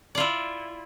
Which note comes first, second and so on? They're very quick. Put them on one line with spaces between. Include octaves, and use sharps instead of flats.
D5 F4 E4